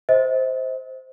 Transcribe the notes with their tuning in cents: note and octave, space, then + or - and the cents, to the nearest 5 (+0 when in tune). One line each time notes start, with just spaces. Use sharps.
C5 +0 D#5 +45